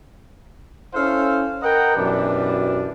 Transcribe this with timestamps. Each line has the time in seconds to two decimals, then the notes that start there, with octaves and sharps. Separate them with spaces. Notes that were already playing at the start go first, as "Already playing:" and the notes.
0.94 C#4 E4 A4 C5 F5
1.62 A#4 B4 D#5 F#5 G5 A#5
1.95 F#2 B2 E3 G3 D4